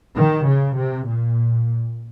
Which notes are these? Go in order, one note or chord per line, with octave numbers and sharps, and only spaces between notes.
D#3
C#3
C3
A#2